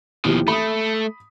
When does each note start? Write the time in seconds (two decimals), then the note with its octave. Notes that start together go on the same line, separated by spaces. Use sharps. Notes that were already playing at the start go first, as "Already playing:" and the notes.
0.25 D#2 B2 E3 F3 G4
0.48 A3 B5 D#6